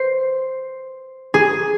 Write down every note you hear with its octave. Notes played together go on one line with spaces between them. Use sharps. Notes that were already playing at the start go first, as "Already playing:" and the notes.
Already playing: C5
G#4